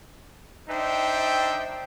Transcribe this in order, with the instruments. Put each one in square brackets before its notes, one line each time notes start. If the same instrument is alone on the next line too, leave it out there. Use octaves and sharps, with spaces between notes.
[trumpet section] D4 D#4 C5 E5 G5